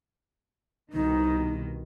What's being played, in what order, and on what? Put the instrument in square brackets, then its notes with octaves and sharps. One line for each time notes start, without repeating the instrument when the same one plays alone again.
[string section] C2 B2 D#3 [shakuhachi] D#4